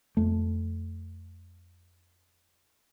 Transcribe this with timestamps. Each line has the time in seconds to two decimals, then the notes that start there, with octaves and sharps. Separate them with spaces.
0.17 F2 A3